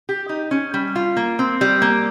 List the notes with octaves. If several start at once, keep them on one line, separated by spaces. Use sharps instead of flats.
G4
D#4
C#4
G3
F4
A#3
C4
G3
A#3